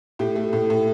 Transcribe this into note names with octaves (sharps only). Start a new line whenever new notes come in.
A2 G4
A3
A2
A2